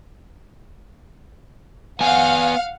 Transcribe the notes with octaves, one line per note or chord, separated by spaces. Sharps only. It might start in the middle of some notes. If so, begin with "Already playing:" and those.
B3 F5 F#5 G#5